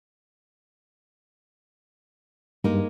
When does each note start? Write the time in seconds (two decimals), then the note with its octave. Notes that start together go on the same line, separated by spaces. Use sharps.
2.64 G2 G#3 A#3 D#4